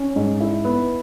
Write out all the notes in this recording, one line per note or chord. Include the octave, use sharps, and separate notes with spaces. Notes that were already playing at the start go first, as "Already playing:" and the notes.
Already playing: C#4
G#2
E4
B3